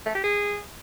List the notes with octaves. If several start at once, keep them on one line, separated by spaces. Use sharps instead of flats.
A3
G4
G#4